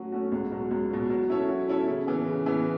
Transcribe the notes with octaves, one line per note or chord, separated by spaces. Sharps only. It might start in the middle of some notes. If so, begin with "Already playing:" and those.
Already playing: F#3 A3 C#4 F#4
A3 C#4 F#4
C#2
B2 F#3
C#2
B2 F#3
F#3
C#4 E4 A4 C#5
F#3
C#4 E4 A4 C#5
C#3
E3 B3
C#3
E3 B3